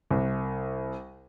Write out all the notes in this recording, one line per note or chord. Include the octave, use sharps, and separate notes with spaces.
C2